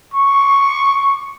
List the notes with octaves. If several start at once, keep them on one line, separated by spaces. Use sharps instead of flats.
C#6